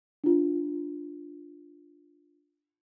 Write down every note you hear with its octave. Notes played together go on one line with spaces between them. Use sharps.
D4 F4